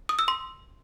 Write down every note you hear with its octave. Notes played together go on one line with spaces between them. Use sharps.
D#6
E6
C6